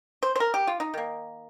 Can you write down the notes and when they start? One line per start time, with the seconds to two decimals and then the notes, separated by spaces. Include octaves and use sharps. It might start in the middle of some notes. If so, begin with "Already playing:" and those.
0.23 C5
0.36 C5
0.40 A#4
0.54 G4
0.67 F4
0.80 D#4
0.94 D#3 A#3